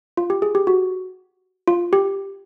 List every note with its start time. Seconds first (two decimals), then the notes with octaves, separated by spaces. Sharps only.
0.17 F4
0.30 G4
0.42 G#4
0.55 G4
0.67 F#4
1.68 F4
1.93 G4